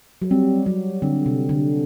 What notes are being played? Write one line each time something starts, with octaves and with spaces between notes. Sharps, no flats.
F#3
G3 C4
F#3
D3 C4
C3
D3